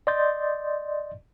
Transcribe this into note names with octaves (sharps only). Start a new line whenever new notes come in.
D5 D#5 C6 G6 A6